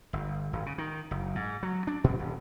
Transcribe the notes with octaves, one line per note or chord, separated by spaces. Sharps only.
G1
G#1
C#3
D#3
F#1
G#2
F#3
D4
A#2
D#1